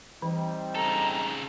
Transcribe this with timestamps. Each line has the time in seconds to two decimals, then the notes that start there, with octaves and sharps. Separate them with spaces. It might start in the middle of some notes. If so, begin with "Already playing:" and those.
0.22 E3 G3 C4 D#4
0.76 C#3 A4 A#5